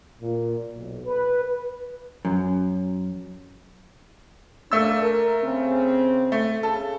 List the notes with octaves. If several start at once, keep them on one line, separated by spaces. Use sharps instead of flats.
A#2
B1
B4
F#2
C3 A3 A#3 D4 E6
A#4
C#3 C4
A3
C#3 A4